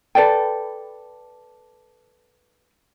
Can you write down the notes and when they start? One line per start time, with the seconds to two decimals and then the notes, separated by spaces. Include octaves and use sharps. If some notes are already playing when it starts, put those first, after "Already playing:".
0.15 A4 B4 D5 G5